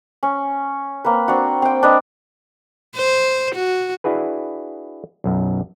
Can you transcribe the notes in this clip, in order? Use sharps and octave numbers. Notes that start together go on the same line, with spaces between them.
C#4
A#3 C4 B4
C4 D4 F#4
C4 G5
D4 B4 D#5
C5
F#4
D4 E4 F#4 G#4 B4
B1 F#2